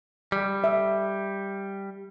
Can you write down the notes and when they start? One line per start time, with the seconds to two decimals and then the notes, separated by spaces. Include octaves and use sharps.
0.32 G3
0.64 E5